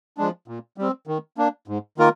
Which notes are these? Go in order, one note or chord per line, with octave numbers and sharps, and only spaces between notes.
F3 G#3 D4
A#2
G3 C4
D#3
A#3 D4
G#2
D#3 A#3 F4 A#4